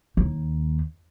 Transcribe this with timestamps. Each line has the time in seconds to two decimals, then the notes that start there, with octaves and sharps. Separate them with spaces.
0.17 D#2